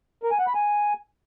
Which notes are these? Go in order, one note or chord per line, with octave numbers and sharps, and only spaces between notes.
A#4
G#5
F#5
B5
G#5